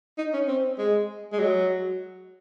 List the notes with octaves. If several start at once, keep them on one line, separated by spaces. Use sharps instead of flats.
D#4
C#4
C4
G#3
G#3
F#3